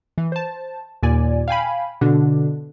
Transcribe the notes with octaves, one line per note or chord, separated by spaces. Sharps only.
E3
C5 A5
D#2 A#2 D5 G#5
F5 G5 G#5 B5
B2 D3 D4